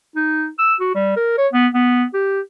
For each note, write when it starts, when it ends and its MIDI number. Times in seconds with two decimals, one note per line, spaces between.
0.16 0.49 63
0.58 0.74 88
0.80 0.90 66
0.95 1.14 55
1.16 1.34 70
1.38 1.47 73
1.53 1.68 59
1.74 2.04 59
2.14 2.40 67